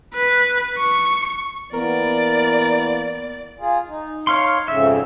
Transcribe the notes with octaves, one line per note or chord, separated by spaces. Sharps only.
B4
C#6
E3 A#3 B3 A#4 D5
F4 G#4
D#4
C#5 F5 C6
F2 G#2 C#3 E5